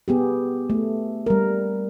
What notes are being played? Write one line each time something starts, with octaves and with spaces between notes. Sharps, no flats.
B3 G4 G#4
A3
G3 A#4